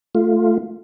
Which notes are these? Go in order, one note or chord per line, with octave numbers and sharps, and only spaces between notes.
A3 F4